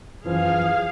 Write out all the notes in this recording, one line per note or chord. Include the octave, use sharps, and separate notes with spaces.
F#2 E3 F3 G#4 F5